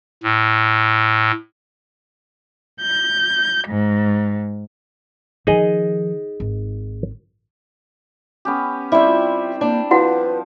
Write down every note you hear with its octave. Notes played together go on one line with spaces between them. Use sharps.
A2
G6
G#2
D#3 F3 D#4 G#4 D#5
G#1
B3 C#4 G4
G3 C4 E4 E5
F4
A#3 D4
F3 E4 F#4 B4 F#5